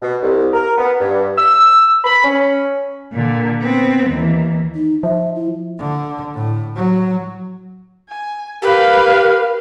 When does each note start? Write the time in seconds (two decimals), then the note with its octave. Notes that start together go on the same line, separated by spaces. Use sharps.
0.01 B2
0.22 C2
0.53 A#4
0.78 B3
1.00 G2
1.38 E6
2.04 B5
2.24 C#4
3.13 A#2 D3
3.60 B3 C4
4.09 D#2 E3
4.75 D#4
5.03 F3 E5
5.35 E4
5.79 D3
6.35 A2
6.76 F#3
8.09 G#5
8.62 G4 A#4 B4 F5